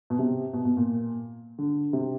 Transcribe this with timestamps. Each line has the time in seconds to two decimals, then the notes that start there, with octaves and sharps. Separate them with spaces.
0.10 B2
0.19 C3
0.53 B2
0.65 B2
0.77 A#2
1.58 D3
1.93 C3